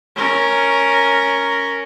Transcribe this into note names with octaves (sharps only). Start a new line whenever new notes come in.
C#4 A#4